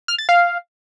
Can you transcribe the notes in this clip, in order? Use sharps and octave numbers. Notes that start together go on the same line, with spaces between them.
F6
A6
F5